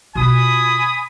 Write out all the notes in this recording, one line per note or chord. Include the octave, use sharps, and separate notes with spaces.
B2 F4 G#5 B5 D#6